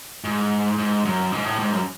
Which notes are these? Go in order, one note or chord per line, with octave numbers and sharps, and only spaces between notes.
G#2
G#2
F#2
G#2
A2
G#2
F#2